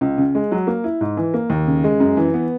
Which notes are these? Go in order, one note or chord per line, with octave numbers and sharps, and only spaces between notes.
C#2
C#3
G#3
F#3
A#3
E4
G#2
E3
A#3
D#2
C#3
G#3
F#2
E3
B3